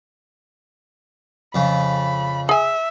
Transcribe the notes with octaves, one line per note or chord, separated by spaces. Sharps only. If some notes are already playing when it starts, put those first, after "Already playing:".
F2 C#3 B5
G#4 E5 G#5